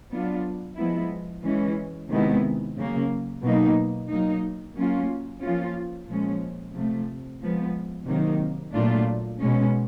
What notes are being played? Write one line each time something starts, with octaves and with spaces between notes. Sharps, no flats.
F#3 B3 D4 F4
F3 G#3 B3 E4
E3 G#3 C#4
C3 D#3 G#3 B3 E4
C#3 F#3 A#3
B2 F#3 A#3 D#4
F#3 A#3 D#4
F#3 A#3 C#4 F4
F3 A#3 C#4 F4
A#2 F3 G#3 C#4
C3 F3 A3
F3 G#3 B3
C3 D#3 F#3 A#3 D#4
A#2 F#3 A3 D4 F4
B2 G#3 C#4